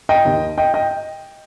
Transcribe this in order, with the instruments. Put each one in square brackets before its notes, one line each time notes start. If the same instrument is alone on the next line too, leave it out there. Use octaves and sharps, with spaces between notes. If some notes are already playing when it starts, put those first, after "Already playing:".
[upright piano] D#5 G5
D#2 D#3
D#5 G5
D#5 G5